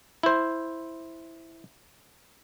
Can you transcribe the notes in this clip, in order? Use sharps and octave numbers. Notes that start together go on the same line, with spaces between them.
E4 C5